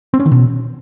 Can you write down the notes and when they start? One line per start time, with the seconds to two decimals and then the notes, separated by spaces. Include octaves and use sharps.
0.14 C4
0.20 C#4
0.26 D#3
0.32 B2